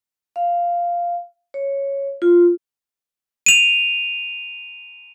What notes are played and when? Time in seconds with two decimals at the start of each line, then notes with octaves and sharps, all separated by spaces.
0.36 F5
1.54 C#5
2.22 F4
3.46 D#7 F7